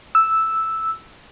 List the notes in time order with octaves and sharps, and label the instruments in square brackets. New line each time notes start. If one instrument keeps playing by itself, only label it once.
[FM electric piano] E6